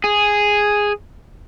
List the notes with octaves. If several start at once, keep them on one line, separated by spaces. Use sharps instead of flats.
G#4